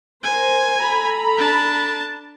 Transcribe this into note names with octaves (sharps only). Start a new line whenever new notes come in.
A#4 C5 G#5
A4 A#5 B5
D4 A5